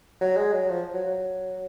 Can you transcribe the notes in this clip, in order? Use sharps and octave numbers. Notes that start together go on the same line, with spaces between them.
F#3
G#3
F#3
F3
F#3
F#3